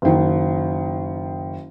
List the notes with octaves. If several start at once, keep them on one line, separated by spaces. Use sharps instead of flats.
F#1 D#3